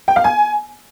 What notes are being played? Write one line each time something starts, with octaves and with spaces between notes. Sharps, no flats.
G5
F5
G#5